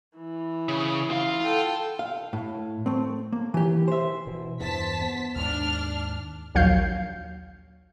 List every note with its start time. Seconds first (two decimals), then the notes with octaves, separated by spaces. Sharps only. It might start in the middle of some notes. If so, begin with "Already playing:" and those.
0.17 E3
0.69 C#3
1.11 F4 F5
1.42 A4 F#5 G5
1.99 F5
2.33 A2
2.86 A3 C4
3.32 A#3
3.54 E3 G4
3.88 C5 E5
4.27 B2 E3
4.60 E2 G2 E3 C5 A5 B6
5.02 B3
5.36 D#2 G#2 D4 F6
6.55 A#1 D#2 F#3 F5 G6 C7